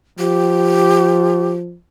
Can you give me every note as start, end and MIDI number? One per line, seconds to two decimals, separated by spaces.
0.19 1.76 53
0.19 1.49 67